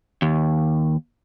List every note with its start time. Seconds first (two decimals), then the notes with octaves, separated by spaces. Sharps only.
0.22 D#2